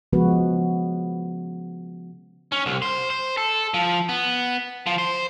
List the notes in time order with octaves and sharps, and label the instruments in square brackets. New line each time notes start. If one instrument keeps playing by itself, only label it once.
[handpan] C#3 F3 G#3 B3 F#4 B4
[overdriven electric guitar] C#4
C2
C5
C5
A4
F3
B3
F3
C5